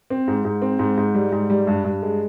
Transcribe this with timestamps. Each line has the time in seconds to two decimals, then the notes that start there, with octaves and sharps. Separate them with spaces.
0.10 C4
0.28 G#2
0.45 G#2
0.62 C4
0.79 G#2
0.97 G#2
1.15 G3
1.32 G#2
1.50 G3
1.67 G2
1.84 G2
2.02 G#3